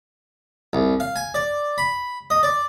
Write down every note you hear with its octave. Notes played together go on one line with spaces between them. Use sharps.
C2
F5
G#5
D5
B5
D#5
D5